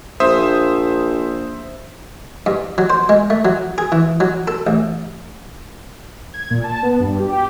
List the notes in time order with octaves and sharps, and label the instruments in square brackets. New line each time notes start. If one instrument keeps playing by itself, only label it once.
[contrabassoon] A#1 [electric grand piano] C5 E5 D#6
[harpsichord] G2
F#3
C5
G#3
A3
F#3
G#4
E3
F#3
A4
A1
[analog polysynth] G#6
A#2
A5
B3
G2
G4
G4